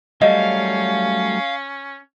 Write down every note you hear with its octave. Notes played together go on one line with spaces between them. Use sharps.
F#3 G3 A3 C#4 D#5 F5